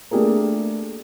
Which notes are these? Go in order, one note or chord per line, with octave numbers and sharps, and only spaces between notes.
A3 A#3 D4 G4 G#4 A#4